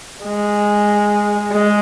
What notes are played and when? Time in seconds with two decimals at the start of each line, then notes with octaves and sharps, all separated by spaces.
0.25 G#3
1.52 G#3